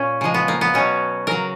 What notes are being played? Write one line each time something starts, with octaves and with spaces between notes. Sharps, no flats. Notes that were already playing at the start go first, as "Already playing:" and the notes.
Already playing: A#2 C#4
C#3 F3 G#3
B3
A#3
B3
B2 F#3 C#4
C#3 F#3 A#4